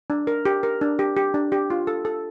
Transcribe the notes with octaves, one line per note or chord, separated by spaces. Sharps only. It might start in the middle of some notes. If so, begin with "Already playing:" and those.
D4
A#4
G4
A#4
D4
G4
G4
D4
G4
F4
A4
A4